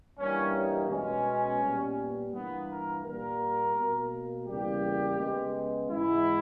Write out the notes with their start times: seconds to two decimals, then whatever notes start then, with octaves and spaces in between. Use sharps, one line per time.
0.19 G2 E3 G3 A#3 C#4
0.55 D#4
0.90 B2 G#3 B3 C#4
1.62 A#2 G3 B3
2.33 G2 E3 A#3 B3
2.69 A#4
3.04 A#2 G3 A#3 A#4
3.76 B2 A#3
4.47 E2 C#3 G3 A#3 G4
5.19 C#3 G#3 B3
5.90 G#2 E3 G#3 B3 E4